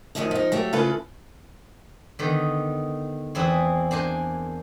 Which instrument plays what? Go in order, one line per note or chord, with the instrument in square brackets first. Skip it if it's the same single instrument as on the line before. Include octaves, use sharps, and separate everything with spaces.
[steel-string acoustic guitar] F#2 A#2 D#3 F3 A3 D#5
F3 D#4
F#3 A3 G4
C#3 A3 C#4 F4 A4 B4
[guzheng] D3 D#3 B3
E2 C4 E4 G#4 B4
A#3 D4 C5 G#5